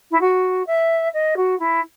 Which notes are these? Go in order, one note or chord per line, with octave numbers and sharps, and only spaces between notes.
E4
F#4
E5
D#5
F#4
E4